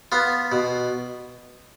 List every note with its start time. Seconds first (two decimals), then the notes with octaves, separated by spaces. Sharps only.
0.12 B3 F4
0.52 B2